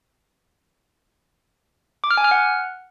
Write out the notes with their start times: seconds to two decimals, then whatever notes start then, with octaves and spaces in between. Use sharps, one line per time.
2.04 D6
2.11 F6
2.17 G#5
2.24 F6
2.31 F#5